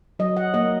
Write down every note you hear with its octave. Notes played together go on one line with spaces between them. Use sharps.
F#3 D#5
F#5
A#3 D#5